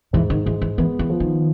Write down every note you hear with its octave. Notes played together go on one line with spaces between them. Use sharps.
G#2 E3
D#3
E3 G#3
E3
E3 B3
E3
F3
D#3